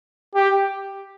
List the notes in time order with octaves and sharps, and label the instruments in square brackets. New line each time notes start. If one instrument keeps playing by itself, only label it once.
[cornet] G4